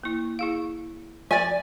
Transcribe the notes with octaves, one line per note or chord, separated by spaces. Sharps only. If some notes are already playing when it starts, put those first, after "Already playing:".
A#3 E4
E4 G#4 F5
F3 D5 G#5